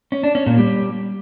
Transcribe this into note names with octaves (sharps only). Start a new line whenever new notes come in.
C#4
D4
C#4
A#2
G3